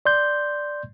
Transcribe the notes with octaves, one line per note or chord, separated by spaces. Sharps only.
D5 C6 G6